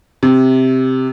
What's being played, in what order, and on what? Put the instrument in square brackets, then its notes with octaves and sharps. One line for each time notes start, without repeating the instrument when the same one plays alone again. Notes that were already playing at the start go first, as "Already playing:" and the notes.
[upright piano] C3